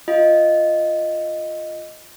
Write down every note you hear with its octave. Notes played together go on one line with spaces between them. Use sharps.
F4 D#5